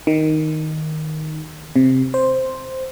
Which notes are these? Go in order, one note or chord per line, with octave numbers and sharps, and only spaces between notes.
D#3
C3
C5